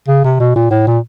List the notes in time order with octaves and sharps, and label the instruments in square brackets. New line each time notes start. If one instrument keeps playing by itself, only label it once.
[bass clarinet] C#3
C3
B2
A#2
A2
A#2